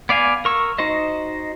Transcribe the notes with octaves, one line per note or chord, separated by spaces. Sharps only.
B3 D5 F5 G#5
A#4 C#6 E6
D#4 F#4 C5 D#5